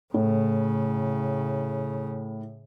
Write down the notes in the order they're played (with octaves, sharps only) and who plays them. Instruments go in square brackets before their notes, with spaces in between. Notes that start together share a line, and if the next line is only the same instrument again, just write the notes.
[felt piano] A2 [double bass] C#3